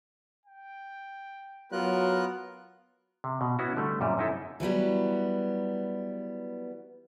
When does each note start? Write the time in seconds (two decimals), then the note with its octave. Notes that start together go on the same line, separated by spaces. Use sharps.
0.46 G5
1.72 F#3 B3 F4 A#4 F#6
3.24 C3
3.41 B2
3.59 B3 C#4 E4 F#4
3.77 D3 G3 A3
4.01 F#2 A#2 G3
4.18 F#2 D#4 E4 A4
4.60 E3 F#3 G3 B3